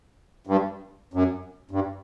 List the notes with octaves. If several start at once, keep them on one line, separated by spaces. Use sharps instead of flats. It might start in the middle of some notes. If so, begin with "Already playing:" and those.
G2
F#2
G2